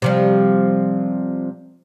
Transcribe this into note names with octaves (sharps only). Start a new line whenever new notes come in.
C3 F3 G3